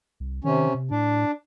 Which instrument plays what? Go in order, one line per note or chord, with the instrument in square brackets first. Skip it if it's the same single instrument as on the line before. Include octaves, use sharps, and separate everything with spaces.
[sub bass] C2
[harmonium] C3 C#4 [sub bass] D#3
[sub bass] C3
[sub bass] A2 [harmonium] D4